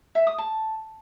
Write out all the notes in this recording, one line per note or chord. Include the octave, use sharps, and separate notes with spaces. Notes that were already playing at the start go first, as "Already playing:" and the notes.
E5
D#6
A5